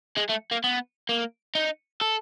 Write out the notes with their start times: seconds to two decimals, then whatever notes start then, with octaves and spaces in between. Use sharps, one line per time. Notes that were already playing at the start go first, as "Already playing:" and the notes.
0.17 G#3
0.30 A3
0.52 A#3
0.64 B3
1.09 A#3
1.55 D#4
2.01 A4